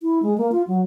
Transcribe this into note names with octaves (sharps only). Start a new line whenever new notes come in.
E4
G#3
A#3
F4
F#3